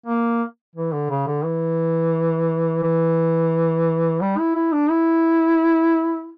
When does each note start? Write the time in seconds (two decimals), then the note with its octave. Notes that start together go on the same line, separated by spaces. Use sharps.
0.06 A#3
0.75 E3
0.93 D3
1.10 C#3
1.27 D3
1.44 E3
2.83 E3
4.21 G3
4.38 E4
4.56 E4
4.73 D4
4.90 E4